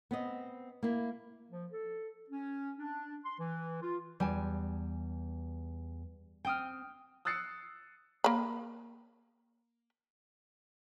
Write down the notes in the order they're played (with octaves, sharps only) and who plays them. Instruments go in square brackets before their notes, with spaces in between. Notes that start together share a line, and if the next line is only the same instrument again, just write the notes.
[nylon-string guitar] B3 C4 D#5
A#3 E4
[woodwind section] F3
A4
C#4
D4
C6
E3
F4
[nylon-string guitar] E2 G#5 A5 [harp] G3
[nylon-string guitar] C4 [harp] G5 D#6 F6
[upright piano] D#6 E6 F#6 A6 C7 C#7
[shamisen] A#3 B5